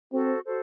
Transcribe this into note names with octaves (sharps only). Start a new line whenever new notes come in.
C4 F#4 A4 C5
F#4 A4 C5